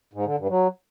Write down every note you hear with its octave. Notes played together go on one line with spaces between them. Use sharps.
G#2
D3
G2
F#3